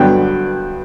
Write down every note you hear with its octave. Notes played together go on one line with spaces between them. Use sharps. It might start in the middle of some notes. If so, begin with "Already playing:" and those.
Already playing: G2 D3 F#3 B3 G5